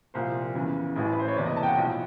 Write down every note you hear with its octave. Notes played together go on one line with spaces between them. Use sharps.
C2 A#2 F3 C5
E2 C#3 E3
A1 A2 E3
B4
C5
C#5
F#1 E2 C3 D5
D#5
A5
G5
F#5
B1 A2 F3